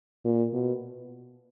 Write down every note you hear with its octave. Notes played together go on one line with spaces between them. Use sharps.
A#2
B2